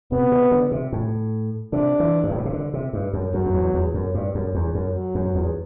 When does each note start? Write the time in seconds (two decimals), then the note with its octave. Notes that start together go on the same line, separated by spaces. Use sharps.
0.12 C3 B3
0.32 C3
0.51 D3
0.72 C3
0.92 A2
1.73 C3 D4
2.00 E3
2.24 G2
2.31 A2
2.38 B2
2.45 C3
2.53 D3
2.74 C3
2.93 G2
3.13 F#2
3.34 F#2 F#3
3.46 F#2
3.54 E2
3.74 E2
3.94 F#2
4.15 G2
4.35 F#2
4.55 E2
4.75 F#2
4.95 F#3
5.15 F#2
5.35 E2